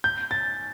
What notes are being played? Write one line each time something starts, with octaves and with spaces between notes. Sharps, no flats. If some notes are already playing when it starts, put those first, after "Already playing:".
G6
A6